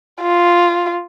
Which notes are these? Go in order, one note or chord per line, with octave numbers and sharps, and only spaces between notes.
F4